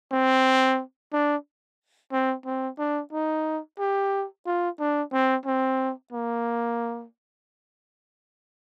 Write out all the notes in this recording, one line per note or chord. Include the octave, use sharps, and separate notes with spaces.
C4
D4
C4
C4
D4
D#4
G4
F4
D4
C4
C4
A#3